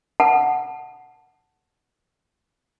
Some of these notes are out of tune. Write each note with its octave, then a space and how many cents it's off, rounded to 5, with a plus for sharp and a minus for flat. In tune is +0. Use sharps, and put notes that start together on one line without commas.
F#5 +0 A5 +0